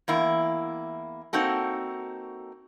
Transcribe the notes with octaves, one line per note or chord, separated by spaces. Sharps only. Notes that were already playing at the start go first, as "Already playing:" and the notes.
E2 A#3 E4
A#3 C4 D#4 F#4 A4